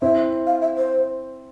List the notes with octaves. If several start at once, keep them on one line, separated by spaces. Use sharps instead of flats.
C4 E4 E5
F5
E5
C5